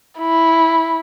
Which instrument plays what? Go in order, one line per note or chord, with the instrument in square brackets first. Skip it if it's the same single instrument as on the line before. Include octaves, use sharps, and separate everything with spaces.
[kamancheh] E4